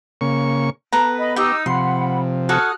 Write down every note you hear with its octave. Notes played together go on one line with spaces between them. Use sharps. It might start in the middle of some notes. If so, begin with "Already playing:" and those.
C#3 A#3 C#6
B3 A4 B4 A#5
D#5 B5
D#4 G4 G5 D#6 E6
C3 F3 F#5 B5 C6
F#4 A4 G#5 D#6 F6 F#6